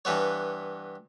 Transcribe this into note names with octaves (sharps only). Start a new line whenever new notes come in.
G2 E3 B3 C#5